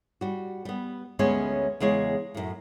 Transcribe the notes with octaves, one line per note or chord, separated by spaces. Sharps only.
G3 F#4
G3 B3
D2 G3 G#3 B3 C#4 C#5
E2 C#3 G#3 C#5
F#2 A2